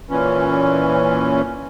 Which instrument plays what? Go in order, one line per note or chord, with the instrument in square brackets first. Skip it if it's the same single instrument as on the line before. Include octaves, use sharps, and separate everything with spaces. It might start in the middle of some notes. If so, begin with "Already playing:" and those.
[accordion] A#2 E3 C#4